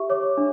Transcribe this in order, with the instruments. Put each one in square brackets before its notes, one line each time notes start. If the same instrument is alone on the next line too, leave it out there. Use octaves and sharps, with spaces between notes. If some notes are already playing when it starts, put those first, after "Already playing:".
Already playing: [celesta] G4 E5 C#6
C#5 D6
D4